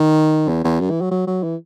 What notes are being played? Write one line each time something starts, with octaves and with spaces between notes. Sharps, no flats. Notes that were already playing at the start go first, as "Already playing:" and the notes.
Already playing: D#3
E2
E2
F#2
E3
F#3
F#3
F#3
E3